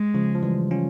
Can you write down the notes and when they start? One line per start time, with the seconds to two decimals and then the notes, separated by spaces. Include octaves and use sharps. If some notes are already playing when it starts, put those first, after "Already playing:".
Already playing: G#3
0.14 C#3 F3
0.35 F3
0.43 E3 G3
0.71 C#4 F4